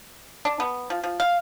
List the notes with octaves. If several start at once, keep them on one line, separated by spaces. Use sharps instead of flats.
D4
B3
F3
F3
F5